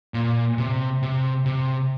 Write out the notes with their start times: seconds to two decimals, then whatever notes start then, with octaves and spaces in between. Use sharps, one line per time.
0.14 A#2
0.58 C3
1.03 C3
1.46 C3